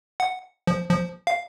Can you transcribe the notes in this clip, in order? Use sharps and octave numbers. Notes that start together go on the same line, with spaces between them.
F#5
F3
F3
F5